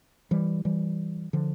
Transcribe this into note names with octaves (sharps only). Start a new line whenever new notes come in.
E3 G3
E3 G3
D3 F3